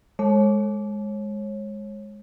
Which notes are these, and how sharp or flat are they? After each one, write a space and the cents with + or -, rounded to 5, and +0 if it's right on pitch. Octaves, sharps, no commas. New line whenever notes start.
G#3 +0 C#5 -30